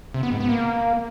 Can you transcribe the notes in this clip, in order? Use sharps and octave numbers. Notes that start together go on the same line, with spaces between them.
C3
B3
G#2
B3
A#3